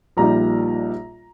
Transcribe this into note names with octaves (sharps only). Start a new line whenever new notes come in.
A#1 A#2 G3 A#3 D#4 A#5